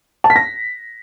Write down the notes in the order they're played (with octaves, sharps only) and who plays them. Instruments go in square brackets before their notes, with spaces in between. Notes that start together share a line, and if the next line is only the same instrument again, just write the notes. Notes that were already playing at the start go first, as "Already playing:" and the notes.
[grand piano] A5
B6
A#6